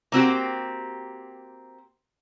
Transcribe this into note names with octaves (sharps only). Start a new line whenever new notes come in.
A#3 C4 F#4 G4